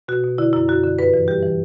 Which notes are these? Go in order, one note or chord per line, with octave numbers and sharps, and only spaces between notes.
B2 F#4
B2
D3 E4
F#2 E4
F#2 F#4
D3
G2 B4
E3
G3 G4
E3